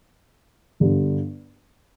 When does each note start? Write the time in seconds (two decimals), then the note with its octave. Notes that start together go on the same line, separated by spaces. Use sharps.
0.80 G1 G2 D3